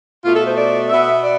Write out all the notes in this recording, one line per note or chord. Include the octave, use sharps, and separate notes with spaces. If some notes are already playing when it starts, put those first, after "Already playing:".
B2 A3 F4
A4
C5
D5
B2 B3 E5
D5